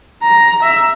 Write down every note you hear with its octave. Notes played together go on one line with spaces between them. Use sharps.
A#5
E5